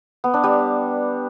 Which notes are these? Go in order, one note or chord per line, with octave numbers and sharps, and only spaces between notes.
B3
D4
G3